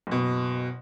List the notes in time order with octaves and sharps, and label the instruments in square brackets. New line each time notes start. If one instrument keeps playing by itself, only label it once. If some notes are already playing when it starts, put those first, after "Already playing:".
[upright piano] F#1 B2